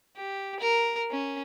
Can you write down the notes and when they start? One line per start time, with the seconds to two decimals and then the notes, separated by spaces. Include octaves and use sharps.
0.16 G4
0.60 A#4
1.11 C#4